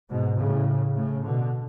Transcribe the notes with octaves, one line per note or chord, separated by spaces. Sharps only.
G#2 B2
A2 C#3
A2 C#3
B2 D3